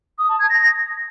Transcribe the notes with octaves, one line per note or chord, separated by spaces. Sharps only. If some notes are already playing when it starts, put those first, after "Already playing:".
D#6
A5
G#6
A#6